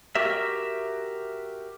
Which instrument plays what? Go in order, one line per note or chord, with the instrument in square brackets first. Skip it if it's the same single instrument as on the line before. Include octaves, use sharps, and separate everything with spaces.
[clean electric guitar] F#4 G4 A#4 E5